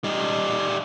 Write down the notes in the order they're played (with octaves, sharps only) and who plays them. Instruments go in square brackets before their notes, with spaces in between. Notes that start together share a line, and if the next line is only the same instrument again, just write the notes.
[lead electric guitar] G3 D#4